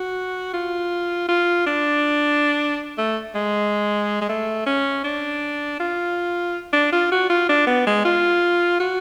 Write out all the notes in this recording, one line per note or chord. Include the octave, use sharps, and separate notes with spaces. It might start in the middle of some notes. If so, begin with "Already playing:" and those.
Already playing: F#4
F4
F4
D4
A3
G#3
G#3
A3
C#4
D4
F4
D4
F4
F#4
F4
D4
B3
G#3
F4
F#4